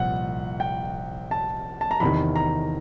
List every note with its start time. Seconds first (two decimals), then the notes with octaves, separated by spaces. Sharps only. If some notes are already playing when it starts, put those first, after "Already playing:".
Already playing: C2 A#2 F3 F#5
0.60 G5
1.31 A5
1.81 A5
1.91 A#5
2.00 E2 C3 D#3 B5
2.36 A#5